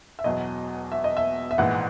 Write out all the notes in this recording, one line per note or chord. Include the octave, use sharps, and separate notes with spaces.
E5
E1 E2 B2 F#3 D#5
E5
D#5
E5
E5
A#1 G#2 E3 F#5